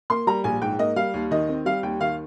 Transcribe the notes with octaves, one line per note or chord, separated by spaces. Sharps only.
A#3 C6
G3 A#5
A#1 G#5
G#2 G5
A#3 D#5
G3 F5
D#2
D#3 D#5
C4
G3 F5
D#2 G5
D#3 F5